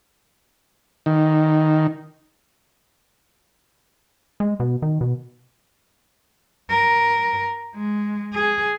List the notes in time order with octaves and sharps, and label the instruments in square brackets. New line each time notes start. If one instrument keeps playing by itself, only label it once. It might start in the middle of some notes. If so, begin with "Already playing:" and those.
[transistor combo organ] D#3
[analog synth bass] G#3
B2
D#3
B2
[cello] A#4
G#3
G#4